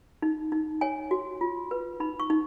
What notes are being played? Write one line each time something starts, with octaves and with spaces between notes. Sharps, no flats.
D#4
D#4
C#5 G#5
F#4
F4
B4
D#4 B5
C#6
D#4